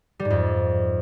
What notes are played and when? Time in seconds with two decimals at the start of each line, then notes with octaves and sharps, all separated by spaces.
0.20 G3
0.25 G#2
0.30 F2